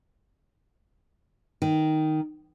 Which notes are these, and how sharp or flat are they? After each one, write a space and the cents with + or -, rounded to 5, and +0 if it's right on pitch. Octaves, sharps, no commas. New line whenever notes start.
D#3 +0 D#4 +0